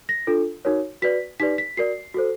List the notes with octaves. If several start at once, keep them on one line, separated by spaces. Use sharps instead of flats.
A#6
D4 F4 A4
D#4 F#4 A#4 C#5
F#4 B4 D5 B6
D#4 G4 B4 D5 B6
B6
F#4 A#4 D5 C7
F#4 A4 C5